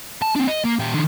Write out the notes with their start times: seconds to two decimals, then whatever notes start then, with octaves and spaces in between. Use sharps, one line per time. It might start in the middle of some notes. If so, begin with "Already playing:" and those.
0.22 A5
0.36 C4 D4
0.47 D#5
0.64 A#3
0.79 A#2 G4
0.94 D#3 D4